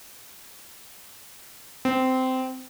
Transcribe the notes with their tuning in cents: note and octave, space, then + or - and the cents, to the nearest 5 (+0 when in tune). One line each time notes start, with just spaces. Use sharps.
C4 -15